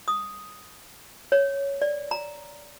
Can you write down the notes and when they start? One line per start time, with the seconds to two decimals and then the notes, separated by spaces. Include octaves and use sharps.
0.08 D#6
1.32 C#5
1.82 D5
2.11 A#5